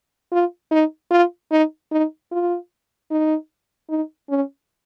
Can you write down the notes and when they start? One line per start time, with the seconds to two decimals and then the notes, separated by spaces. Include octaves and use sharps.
0.32 F4
0.71 D#4
1.11 F4
1.51 D#4
1.92 D#4
2.31 F4
3.11 D#4
3.89 D#4
4.29 C#4